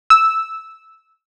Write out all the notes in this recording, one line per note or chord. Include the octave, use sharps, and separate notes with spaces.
E6